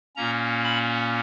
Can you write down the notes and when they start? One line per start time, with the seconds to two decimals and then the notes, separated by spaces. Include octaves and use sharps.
0.16 A#2 A#3 C#4 A#5
0.64 B5